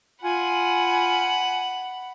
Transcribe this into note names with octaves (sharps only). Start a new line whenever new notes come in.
F4 F#5 G#5 B5